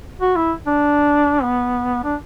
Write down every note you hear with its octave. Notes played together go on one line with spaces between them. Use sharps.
F#4
E4
D4
B3
D4